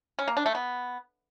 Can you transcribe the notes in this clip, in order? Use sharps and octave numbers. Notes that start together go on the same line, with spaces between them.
C#4
A#3
D4
A3
B3